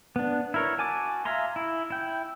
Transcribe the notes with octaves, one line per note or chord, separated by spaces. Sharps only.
B3 D4
E4 A#4 C#5
F#4 G#5 A5 D6
E5 F5 G#5 A#5 C6
E4
E4 G5